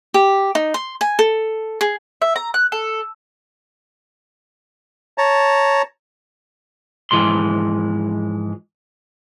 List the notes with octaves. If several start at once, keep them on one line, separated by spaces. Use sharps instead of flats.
G4
D#4
C6
G#5
A4
G#4
E5
A#5
F#6
A4
C#5 A5 A#5
G#2 E3 F3 G#3 C6